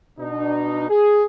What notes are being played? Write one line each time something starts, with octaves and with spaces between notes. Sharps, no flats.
B2 D4 D#4
G#4